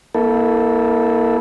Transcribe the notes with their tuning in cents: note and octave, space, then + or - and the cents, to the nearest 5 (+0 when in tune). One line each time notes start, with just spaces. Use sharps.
A#3 +25 E4 -30 A4 +0